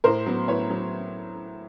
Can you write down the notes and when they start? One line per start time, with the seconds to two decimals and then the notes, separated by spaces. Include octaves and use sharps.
0.04 A2 A#4 C5
0.26 F#3 B3
0.48 A2 B4 C#5
0.70 F#3 B3